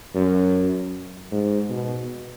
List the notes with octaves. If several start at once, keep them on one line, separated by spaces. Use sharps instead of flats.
F#2
G#2
B2